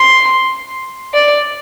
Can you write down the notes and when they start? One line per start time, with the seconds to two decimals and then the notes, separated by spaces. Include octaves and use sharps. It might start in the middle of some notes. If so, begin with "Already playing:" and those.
Already playing: C6
1.14 D5